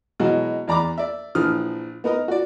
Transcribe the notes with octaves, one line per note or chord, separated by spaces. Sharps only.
B2 E3 F#3 G#3
E2 D5 A#5 B5 D6
D5 E5
A#1 E3 F3 D#6 F6
B3 D#4 A#4 D#5
F#4 D5